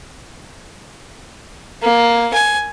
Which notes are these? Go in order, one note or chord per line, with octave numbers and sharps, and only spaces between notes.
A#3
G#5